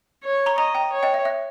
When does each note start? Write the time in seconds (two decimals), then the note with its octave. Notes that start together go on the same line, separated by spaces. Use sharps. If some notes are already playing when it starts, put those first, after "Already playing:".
0.24 C#5
0.46 A#5 C#6
0.58 D#5 A#5 C#6
0.75 G5 A#5
0.92 C#5
1.03 D#5 G5
1.14 E5
1.25 E5